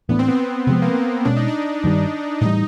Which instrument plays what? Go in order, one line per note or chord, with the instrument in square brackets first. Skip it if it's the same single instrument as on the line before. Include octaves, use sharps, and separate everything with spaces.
[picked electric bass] A2 E3 A3 D4 [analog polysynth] B3
[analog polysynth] C4
B3
C4
[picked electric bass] C3 F3 G#3 [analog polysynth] B3
[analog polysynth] A#3
A#3
[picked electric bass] B2 G#3 C#4 [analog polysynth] D4
[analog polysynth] D#4
D4
[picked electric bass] G2 D#3 G3
[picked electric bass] A2 E3 G3 [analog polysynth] D#4